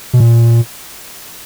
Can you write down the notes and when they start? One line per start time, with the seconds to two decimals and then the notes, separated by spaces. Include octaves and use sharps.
0.13 B2
0.20 A#2